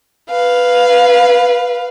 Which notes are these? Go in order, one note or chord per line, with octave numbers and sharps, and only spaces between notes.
B4 F5